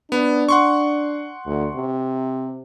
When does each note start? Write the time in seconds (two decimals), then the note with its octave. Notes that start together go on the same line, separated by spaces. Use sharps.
0.12 B3 D4
0.49 F#5 C6 C#6
1.46 D2
1.76 C3